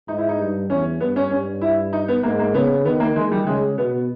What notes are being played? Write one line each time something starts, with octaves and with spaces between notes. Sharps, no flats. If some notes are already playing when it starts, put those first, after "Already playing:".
G#2 D#4
E4
D#4
G2
E2 C#4
G2 B3
C#4
G2 C#4
E4
D#4
B3
G#2 A#3
A#3
C#3 B3
D#3 B3
A#3
D#3 G#3
G3
C#3 G#3
B2 B3